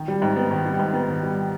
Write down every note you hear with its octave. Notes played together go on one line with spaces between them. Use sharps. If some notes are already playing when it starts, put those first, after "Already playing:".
Already playing: D#3
G3
G#2
B3
D#3
G3
G#2
B3
D#3
G3